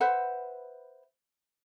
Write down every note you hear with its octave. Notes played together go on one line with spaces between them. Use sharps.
B4 C5 E5 F#5